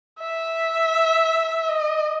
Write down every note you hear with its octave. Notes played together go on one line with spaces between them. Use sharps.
E5
D#5